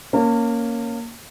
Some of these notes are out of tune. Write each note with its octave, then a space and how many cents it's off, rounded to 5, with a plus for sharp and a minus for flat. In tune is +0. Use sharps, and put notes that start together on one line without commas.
A#3 +0 C#4 +0 A5 +45